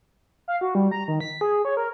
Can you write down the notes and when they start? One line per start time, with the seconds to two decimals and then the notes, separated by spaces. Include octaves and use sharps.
0.48 F5
0.61 F#4
0.75 G3
0.91 A#5
1.08 D#3
1.21 B6
1.41 G#4
1.65 C#5
1.77 A#4